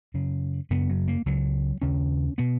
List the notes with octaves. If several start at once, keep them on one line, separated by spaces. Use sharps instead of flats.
F#2 C#3
F#2 C#3 B3
F#3
A#3
C#2 C#3 F#3
D#2 C#3 C#4
B2 B3